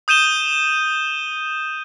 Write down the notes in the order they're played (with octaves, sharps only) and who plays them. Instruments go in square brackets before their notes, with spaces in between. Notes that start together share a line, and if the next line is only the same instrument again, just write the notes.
[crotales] D#6 G6 D#7 E7 G7